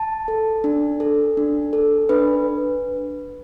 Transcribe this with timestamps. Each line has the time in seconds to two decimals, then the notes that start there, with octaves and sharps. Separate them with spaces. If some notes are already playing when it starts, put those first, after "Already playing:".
Already playing: A5
0.28 A4
0.64 D4
1.00 A4
1.37 D4
1.73 A4
2.09 D4 B4